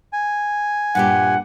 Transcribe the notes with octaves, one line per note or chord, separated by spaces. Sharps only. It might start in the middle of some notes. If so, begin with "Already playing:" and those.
G#5
G2 A#2 G4 F#5